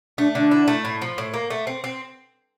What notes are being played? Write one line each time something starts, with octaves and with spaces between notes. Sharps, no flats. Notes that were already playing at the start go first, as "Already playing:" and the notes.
A3 D4
D3 D4
E4
A3
A2
F3
A2
A#3
A3
C4
C4